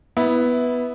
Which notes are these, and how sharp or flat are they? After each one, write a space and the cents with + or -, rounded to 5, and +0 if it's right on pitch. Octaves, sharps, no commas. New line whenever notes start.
B3 +0 E4 -15